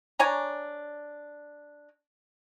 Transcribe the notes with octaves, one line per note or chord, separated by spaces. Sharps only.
D4 C#5 G#5 A#5